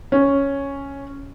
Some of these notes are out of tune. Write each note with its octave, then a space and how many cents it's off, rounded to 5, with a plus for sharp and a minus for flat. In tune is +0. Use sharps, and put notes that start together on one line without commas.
C#4 +0